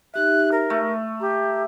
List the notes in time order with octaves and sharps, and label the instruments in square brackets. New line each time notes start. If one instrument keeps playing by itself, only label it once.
[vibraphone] D#4 G4 E5 [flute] F#6
[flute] A#4
[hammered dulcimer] A3
[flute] G4 [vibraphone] A#5